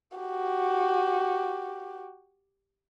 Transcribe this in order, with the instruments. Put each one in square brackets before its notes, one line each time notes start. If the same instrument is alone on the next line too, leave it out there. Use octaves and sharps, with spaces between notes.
[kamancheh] F#4 G4